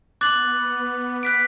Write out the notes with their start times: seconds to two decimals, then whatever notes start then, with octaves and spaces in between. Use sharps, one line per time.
0.21 B3 D6 F#6 A6 F#7
0.72 B3
1.23 F#6 B6 D7